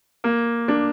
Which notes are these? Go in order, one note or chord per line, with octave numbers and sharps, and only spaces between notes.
A#3
D4